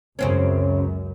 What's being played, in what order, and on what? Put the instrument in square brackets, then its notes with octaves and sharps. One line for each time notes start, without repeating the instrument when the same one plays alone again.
[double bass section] C#2 F#2 [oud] C#3 C4 C#4